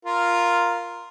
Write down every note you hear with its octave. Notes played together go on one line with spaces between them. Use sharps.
F4 A#4